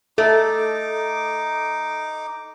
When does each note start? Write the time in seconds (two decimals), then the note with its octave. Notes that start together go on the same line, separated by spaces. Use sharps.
0.18 A3 D#4 A4 D6